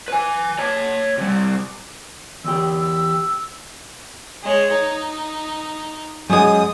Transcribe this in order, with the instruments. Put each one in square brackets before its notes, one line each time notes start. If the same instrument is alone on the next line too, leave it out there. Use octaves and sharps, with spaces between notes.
[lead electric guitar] B4 G#5
C#5 A5
C3 G3
[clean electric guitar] E2 G4 [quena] E6
[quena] E6
[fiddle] G#3 C#5
D#4
[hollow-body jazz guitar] F#2 G#3 [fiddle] D#6